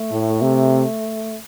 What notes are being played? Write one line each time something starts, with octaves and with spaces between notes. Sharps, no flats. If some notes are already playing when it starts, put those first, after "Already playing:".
Already playing: A3
A2
C3